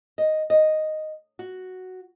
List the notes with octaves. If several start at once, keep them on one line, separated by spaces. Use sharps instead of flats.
D#5
D#5
F#4